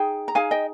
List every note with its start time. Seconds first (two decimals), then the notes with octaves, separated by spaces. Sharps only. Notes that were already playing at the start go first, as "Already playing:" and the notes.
Already playing: D#4 G#4 G5
0.28 A#5
0.35 D#4 G#4 F5 G#5
0.51 D#5 G5